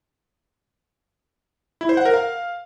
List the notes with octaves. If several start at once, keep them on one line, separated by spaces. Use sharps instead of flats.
E4
C5
F#5
A#4
F5